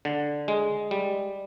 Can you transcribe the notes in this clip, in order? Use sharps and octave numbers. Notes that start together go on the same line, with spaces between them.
D3
G#3
G3